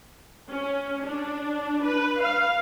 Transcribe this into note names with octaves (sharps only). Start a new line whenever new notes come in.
C#4
D4
B4
F5